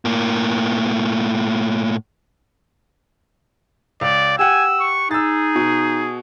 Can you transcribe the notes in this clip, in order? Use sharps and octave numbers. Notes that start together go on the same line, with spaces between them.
A2 A#3
C#2 D5
G4 F#5 G#5 E6
C#6
D#4 G#4 E6 A6
B2